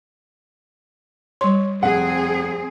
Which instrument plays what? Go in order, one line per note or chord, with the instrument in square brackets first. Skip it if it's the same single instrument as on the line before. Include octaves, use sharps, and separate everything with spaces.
[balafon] G3 C6 [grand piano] C#5
[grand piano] F1 F#5 [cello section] C4 G#4